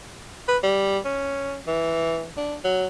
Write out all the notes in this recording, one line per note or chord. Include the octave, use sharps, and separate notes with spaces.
B4
G3
C#4
E3
D4
F#3